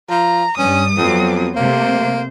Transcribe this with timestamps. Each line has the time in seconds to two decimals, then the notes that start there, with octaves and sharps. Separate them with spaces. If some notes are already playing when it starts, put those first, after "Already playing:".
0.10 F3 A#5
0.58 G2 G3 C#4 D#6
0.98 F2 F#3 B3 C4
1.56 C3 A3 A#3 C5